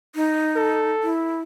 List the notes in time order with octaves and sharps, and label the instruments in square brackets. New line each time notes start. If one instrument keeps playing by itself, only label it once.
[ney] D#4
[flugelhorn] A4
[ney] E4